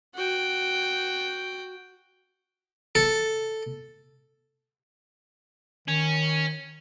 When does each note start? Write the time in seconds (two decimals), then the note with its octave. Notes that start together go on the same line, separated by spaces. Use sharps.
0.15 F#4 G5
2.95 A4
5.88 D#3 C#4